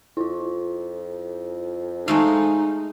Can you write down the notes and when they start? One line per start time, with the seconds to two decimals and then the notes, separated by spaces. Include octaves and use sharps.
0.17 F2 E4 F4
2.08 G#3 A3 D#4 F5